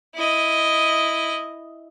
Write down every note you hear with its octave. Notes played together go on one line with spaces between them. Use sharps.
E4 D#5